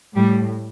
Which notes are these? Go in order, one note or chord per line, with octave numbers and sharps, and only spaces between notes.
A2 G3